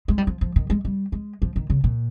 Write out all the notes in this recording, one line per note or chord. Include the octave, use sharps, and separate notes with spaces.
G#3
G3
F3
F3
D#3
G#3
G3
G#3
F3
D#3
C#3
A#2